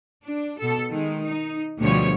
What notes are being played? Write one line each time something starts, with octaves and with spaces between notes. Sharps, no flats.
D4
B2 A4
D#3 G#3
D#4
D2 B2 D3 F3 G3 C#5